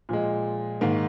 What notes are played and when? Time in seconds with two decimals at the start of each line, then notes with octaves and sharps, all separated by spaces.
0.09 A#2 F3 G#3
0.81 G#2 D#3 A#3